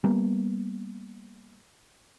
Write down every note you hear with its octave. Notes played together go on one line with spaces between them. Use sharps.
G3 A#3 B3